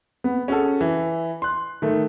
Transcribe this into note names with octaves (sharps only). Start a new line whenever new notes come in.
B3
C#4 F#4 G#4 A4
E3
C6 F#6
D#3 A3